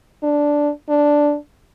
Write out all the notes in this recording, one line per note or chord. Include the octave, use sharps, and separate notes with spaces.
D4
D4